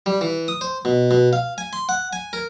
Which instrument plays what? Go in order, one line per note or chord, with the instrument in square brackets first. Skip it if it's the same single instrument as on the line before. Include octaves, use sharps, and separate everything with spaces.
[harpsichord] G3
E3
D#6
C5
B2
B2
F5
G#5
C6
F#5
G#5
A#4